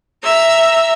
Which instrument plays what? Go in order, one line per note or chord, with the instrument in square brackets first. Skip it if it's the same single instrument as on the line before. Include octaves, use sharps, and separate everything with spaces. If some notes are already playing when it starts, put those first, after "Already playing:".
[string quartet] E5 A#5 E6